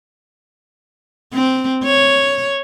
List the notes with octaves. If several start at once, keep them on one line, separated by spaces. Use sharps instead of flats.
C4
C#5